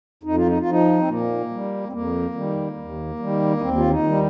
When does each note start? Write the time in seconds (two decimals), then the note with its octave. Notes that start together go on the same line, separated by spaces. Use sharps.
0.23 F2 D#4
0.36 F4
0.47 D#4
0.59 F4
0.66 F3 D#4
0.99 C4
1.08 A#2 A#3
1.51 G3
1.88 C4
1.92 F2 A#3
2.34 D#3 G3
2.78 D#2
3.19 D#3 G3
3.57 D#4
3.61 D#2 C4
3.78 F4
3.90 D#4
4.04 D#3 G3